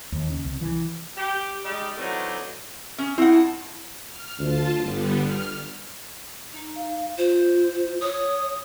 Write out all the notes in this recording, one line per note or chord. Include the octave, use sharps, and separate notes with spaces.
D#2
C#3
C2
E3
G4
G3 G#3 D#4 G4 D5
E3 F#3 A3 C4 D4 D#4
C#4
C4 E4 F#5
A5
F6
D2 F4 A5
G1 D3 G3 B3
F6
D#4
F5
F4 C5
C#5 D#6